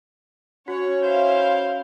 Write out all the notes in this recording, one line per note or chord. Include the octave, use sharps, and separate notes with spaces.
C#4 F#4 C#5 F#5
E4 C5 F5 C6 G6